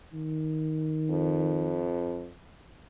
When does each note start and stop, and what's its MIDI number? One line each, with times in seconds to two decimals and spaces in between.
0.14 1.91 51
1.10 2.30 41